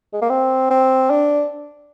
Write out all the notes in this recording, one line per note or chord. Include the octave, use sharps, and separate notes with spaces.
G#3
A#3
C4
C4
D4